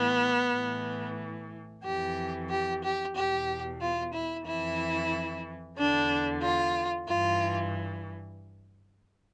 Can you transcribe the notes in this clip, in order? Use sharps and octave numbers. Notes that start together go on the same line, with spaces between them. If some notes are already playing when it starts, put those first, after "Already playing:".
Already playing: A2 E3 B3
A2 E3
F2 E3 G4
G4
G4
E2 B2 G4
F4
E4
F2 E3 E4
E2 D3 D4
F4
G2 E3 F4